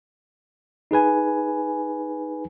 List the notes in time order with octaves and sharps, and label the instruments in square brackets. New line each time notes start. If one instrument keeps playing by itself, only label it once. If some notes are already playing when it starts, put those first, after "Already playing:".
[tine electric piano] D#4 G#4 B4 G#5